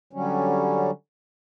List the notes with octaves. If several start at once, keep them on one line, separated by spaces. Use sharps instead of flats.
D3 F#3 G3 C#4